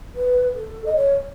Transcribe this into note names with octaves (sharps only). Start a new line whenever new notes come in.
B4
A4
D#5
C#5